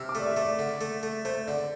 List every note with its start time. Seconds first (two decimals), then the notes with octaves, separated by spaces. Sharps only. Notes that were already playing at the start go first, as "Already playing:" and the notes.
Already playing: C3 E6 F6
0.09 D6
0.15 A3 D5
0.26 E5
0.37 A3
0.42 D5
0.59 D3
0.81 A3
1.03 A3
1.25 A3 C5
1.48 D3 D5